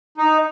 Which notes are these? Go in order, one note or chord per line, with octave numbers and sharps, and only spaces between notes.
D#4